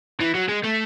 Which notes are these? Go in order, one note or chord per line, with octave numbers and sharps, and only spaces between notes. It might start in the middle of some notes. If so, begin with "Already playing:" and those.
E3
F#3
G#3
A3